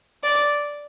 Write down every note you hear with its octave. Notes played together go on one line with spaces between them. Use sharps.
D5